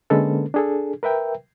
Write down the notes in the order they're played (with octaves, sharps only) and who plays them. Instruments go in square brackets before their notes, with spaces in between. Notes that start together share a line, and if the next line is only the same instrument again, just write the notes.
[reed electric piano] D3 G#3 A#3 C#4 A4 B4
D4 G#4 A4
A#4 B4 E5 G5